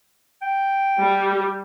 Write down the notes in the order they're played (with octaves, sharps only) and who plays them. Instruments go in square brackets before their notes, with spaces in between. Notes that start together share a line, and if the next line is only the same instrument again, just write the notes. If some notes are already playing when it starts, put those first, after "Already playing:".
[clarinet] G5
[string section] G3